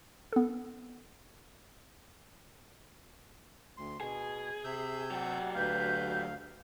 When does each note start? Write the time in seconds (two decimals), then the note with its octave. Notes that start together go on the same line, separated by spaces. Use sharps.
0.33 B3 A4
3.77 D2 C6
4.01 B2 G#4
4.64 C3 E5 E6 G6
5.11 F#3 G4 F#5
5.55 D2 B4 F5 G6